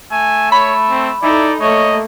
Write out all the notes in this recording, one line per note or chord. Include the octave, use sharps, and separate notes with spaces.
A3 G#5
C#5 B5
C4
D#4 E4 A4 D5
A3 A#3 C#5 D#5